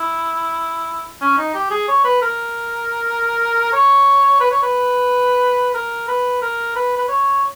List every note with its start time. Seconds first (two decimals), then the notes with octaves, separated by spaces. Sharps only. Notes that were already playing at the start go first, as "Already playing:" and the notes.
Already playing: E4
1.21 C#4
1.38 D#4
1.54 G4
1.70 G#4
1.88 C#5
2.04 B4
2.22 A#4
3.73 C#5
4.40 B4
4.51 C#5
4.62 B4
5.74 A#4
6.08 B4
6.42 A#4
6.76 B4
6.97 B4
7.08 C#5